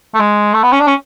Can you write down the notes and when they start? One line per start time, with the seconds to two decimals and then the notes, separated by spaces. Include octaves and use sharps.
0.14 A3
0.19 G#3
0.54 A3
0.63 B3
0.72 C#4
0.80 D4
0.87 C#4